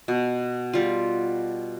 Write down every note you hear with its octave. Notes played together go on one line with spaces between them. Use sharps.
B2
G3 F4